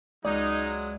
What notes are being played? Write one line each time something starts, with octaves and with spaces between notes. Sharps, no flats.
C#2 F#3 G#3 D#4 D5